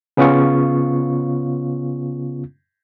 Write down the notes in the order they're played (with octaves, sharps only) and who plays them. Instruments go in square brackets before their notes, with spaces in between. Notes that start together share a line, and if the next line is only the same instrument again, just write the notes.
[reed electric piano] C#3 B3 C#4 F4 C#6